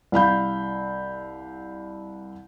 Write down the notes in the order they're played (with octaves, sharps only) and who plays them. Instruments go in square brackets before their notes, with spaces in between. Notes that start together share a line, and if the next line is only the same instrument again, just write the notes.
[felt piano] C2 F5 B5 G6